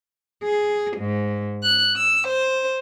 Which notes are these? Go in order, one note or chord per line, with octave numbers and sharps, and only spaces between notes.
G#4
G#2
F#6
E6
C5